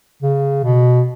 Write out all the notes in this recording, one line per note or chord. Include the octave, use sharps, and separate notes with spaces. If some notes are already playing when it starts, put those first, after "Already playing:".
C#3
B2